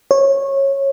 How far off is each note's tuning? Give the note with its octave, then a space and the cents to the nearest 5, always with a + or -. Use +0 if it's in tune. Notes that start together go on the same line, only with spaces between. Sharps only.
C#5 -20